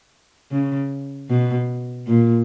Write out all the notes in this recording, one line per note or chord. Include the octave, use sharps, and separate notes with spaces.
C#3
B2
A#2